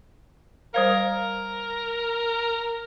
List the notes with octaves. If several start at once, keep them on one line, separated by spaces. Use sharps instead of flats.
G3 A#4 C5 F5